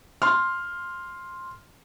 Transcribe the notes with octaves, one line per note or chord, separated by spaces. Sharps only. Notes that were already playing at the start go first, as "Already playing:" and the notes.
C6 F6